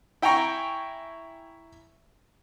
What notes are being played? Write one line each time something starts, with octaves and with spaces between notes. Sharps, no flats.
E4 G5 G#5 A#5 C#6